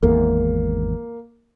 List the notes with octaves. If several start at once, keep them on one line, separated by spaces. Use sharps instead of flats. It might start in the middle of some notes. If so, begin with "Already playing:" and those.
G#1 E2 G#2 A#3